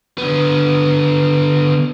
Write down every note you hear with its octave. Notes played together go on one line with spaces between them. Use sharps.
D3 B3